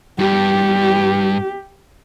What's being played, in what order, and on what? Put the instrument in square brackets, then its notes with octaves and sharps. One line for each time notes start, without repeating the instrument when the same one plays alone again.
[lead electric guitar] G2 [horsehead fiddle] G4